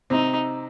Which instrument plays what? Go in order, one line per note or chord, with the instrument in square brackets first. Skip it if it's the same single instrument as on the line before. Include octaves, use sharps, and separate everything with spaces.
[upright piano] C3 C4 [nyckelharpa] D#4